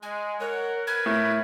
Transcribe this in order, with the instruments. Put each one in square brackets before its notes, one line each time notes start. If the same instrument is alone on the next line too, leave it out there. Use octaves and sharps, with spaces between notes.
[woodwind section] G#3 [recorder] G#5
[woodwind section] A#4 F#5 [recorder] C#5
[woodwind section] A#4 B4 [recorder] G#6
[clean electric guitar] A2